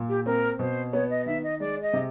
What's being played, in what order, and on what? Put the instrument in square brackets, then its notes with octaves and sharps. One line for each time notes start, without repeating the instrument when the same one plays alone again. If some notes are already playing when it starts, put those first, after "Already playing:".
Already playing: [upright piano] A#2
[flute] G4
[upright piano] C4 [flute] A#4
[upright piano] B2 [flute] C5
[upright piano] B3 [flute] C#5
[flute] D#5
[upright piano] D#3 [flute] E5
[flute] D#5
[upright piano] G#3 [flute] D5
[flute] D#5
[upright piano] C3